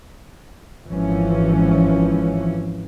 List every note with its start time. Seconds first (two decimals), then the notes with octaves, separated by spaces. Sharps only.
0.89 G#1 E3 F3 C#4